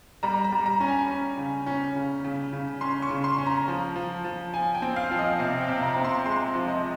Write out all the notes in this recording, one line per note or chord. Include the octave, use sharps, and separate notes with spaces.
G3 A#5
A#5
G3
A#5
C#4
G#5
C#4
C#3
C#4
C#3
C#3
C#3
C#4 C6
C#6
C#3
C6
C#4
A#5
F3
F3
F3
F3 G#5
G5
C4
F5
F3
D#5
C3 F5
G5
C3
A#5
C4
C6
G#3 C6
F3
D#5